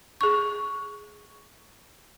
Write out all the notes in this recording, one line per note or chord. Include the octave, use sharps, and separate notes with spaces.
G#4 C#6